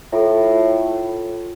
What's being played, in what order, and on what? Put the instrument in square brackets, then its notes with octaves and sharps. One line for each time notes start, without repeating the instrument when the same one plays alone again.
[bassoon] A2 [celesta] F4 A4